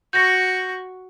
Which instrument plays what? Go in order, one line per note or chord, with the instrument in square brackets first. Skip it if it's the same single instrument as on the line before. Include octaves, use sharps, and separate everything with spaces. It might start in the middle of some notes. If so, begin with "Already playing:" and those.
[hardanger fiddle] F#4 C#6 [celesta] G6 A#6